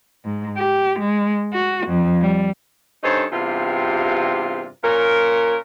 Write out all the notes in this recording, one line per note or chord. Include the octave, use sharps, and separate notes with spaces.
G#2
G4
G#3
F#4
F2
G3
G2 C#4 D#4 A4 C5
E2 G2 C3 F4
A#2 C#4 A#4